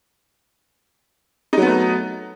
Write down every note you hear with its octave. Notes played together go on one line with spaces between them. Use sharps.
F#3 A3 B3 D#4